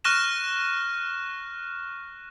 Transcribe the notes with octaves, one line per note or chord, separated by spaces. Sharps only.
C#6 F6 F#6 A#6 E7